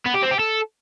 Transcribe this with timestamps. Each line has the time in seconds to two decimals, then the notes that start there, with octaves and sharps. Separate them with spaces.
0.06 B3
0.14 G4
0.23 C4
0.31 G4
0.39 A4